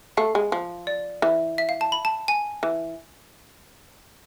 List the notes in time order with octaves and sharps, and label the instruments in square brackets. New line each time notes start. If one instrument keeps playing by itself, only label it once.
[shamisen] A3 [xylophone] F5
[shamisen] G#3
F3
[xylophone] D5
[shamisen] E3
[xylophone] E5
F5
A5
B5
A5
G#5
[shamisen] E3